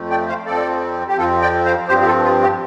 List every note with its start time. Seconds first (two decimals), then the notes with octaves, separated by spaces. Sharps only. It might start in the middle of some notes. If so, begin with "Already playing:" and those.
Already playing: F2 F3 A3
0.10 D5 G5
0.28 C5 F5
0.46 F2 F3 C4 A4 D5
1.08 G4
1.17 F2 F3 C4 F4 A4
1.41 D5 G5
1.65 C5 F5
1.88 G2 F3 C4 G4 C5
2.01 G4
2.06 F4 A4
2.24 F4
2.42 G4